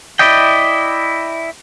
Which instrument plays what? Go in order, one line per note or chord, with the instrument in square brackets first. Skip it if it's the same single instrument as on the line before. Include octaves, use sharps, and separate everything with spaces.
[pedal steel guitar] E4 D5 D#5 G5